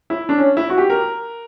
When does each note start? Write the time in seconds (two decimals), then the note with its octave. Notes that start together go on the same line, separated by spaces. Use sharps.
0.10 E4
0.29 D4
0.38 C#4
0.57 E4
0.70 F#4
0.78 G4
0.90 A#4